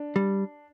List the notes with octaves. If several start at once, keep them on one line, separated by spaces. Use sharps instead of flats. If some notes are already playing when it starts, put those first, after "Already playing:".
Already playing: D4
G3